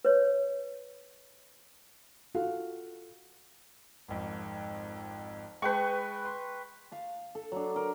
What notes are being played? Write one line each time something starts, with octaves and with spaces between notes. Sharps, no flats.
B4 C#5
F4 F#4 A4 F5
G#1 F2 G#2
G#3 B4 G5 A5 C#6
C6
F5 A5
A4
F#3 D4
A#4